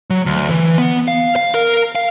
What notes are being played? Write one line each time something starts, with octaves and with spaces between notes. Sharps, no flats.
F#3
D2
E3
B3
F5
F5
A#4
F5